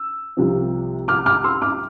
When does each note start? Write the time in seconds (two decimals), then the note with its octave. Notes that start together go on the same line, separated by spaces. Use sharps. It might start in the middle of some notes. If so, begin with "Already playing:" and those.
Already playing: E6
0.37 C2 C3 F3 C4
1.08 D6 F6
1.26 D6 F6
1.44 C6 E6
1.62 D6 F6